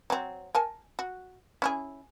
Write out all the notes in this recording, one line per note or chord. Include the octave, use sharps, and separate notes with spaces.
F#3 C4
A#4 G#5 A5
F#4
C#4 E4 G#4